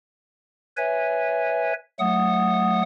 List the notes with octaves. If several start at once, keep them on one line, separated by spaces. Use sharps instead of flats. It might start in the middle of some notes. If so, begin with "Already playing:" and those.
B4 C#5 E5 G#5
F#3 A3 F#5 D#6